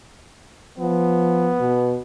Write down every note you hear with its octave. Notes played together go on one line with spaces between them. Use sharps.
F3 B3
B2